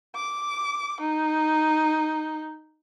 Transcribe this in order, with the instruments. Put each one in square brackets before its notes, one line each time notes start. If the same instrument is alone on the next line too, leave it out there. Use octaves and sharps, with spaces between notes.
[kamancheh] D6
D#4